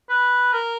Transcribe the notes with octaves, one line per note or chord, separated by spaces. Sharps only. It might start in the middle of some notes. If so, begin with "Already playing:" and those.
B4
A#4